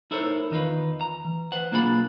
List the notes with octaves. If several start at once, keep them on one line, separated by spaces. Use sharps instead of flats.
D#4 E4 A4 A#4 C5 C#5
E2 D#3 D#4 F4 B4
A#5
E3
B4 C5 F#5
B1 A#3 D4 F4 G#4 B5